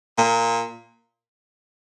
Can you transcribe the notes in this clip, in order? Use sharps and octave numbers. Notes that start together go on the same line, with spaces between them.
A#2